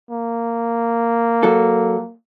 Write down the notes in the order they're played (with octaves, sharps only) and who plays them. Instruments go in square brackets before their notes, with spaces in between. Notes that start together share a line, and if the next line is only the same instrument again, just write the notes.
[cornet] A#3
[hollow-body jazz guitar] F#3 A4